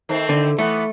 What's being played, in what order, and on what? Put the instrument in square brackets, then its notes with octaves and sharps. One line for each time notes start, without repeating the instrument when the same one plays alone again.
[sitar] D#3 A3 C4
[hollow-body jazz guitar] D3
[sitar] E3 B3 [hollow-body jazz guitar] A3